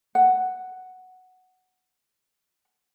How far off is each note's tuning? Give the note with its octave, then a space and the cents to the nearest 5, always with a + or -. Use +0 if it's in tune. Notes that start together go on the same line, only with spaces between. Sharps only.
F#5 +0